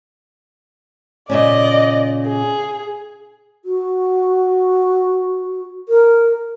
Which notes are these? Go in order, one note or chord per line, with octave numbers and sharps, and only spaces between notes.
A#2 C#3 C#4 D5 D#5
G#4
F#4
A#4